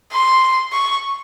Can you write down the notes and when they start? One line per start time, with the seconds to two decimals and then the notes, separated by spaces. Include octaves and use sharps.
0.13 C6
0.73 C#6